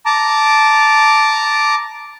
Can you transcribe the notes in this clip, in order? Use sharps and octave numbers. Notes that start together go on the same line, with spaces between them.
A5 A#5 D6